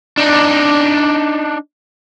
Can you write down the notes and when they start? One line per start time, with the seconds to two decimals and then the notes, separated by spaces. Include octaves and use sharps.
0.17 D4 D#4